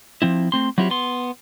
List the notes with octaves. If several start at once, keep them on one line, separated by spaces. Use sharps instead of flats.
F3 C4 E4
A3 C4 C6
F#3 C4 E4 F4 G4
B3 C6